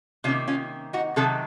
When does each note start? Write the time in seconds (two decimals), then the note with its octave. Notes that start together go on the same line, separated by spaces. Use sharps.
0.24 C3 D#3 A#3 C#4 F4
0.48 C#4 F4
0.93 D#4 F#4
1.16 C3 D#3 F#3 A4